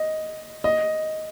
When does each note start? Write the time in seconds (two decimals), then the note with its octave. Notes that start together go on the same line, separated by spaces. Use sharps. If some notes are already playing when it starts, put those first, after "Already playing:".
Already playing: D#5
0.64 D#5